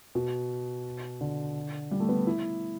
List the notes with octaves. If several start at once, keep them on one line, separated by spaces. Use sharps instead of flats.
B2
D3
G3
A3
B3
E4